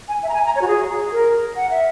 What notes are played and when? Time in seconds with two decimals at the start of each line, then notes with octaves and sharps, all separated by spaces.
0.08 G#5
0.23 E5
0.29 A#5
0.34 G#5
0.45 A#5
0.55 C#5
0.62 F#4
0.68 G#4
1.12 A#4
1.56 F#5
1.70 E5